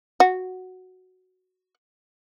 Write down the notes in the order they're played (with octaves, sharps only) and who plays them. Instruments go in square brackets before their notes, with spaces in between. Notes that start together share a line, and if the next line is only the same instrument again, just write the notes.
[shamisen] F#4